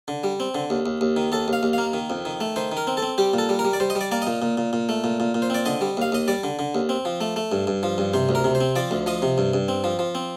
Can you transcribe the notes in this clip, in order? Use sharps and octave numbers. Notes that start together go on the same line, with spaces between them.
D3
G3
C4
D3
D#2
D#2
D#2
D#3
D#2 A4
D#2 F5
D#2
A#3 F5
D#3
F2
D#3
A3
D#3 C5
D#3
A#4
C4
A4
C4
G3 G4
A#2 A4
G3
A#4
G3
D5
G3 C5
D#5
G3
D5
A#3 D5
A#2 D#5
A#2
A#2
A#2
A3
A#2
A#2
A#2
C5
C4 D5
D3 D#5
G3
D#2 F5
D#2 D#5
G3 D5
D3
D3
D#2
C4
F3
A3
A3
G2
G2
F3
G2
C3 C5
D2
A#4
C3
C5
C4
F3 D5
D2
F3 D#5
C3
G2
G2
C4
F3
F3
C4